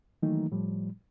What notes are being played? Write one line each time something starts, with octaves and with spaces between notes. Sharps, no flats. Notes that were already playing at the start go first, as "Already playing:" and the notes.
D#3 E3 F#3 A3 A#3 D#4
A2 F3 G3